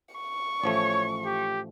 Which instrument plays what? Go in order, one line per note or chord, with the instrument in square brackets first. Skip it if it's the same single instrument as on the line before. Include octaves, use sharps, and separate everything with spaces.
[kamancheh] C#6
[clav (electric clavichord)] A1 F3 A3 [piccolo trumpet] C#5
[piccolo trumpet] G4